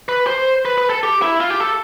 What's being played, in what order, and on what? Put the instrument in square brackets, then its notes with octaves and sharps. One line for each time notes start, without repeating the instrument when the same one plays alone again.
[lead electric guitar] B4
C5
B4
B4
A4
G4
E4
F4
G4
A4